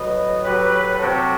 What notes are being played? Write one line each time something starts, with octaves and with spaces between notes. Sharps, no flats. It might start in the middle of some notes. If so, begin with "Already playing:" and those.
Already playing: A2 F#3 B4 D#5
A2 F#3 G4 B4
C3 F#3 F#4 A4